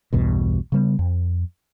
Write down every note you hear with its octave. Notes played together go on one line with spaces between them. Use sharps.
B1 E2 G2 B2
C#3 G3 B3
F2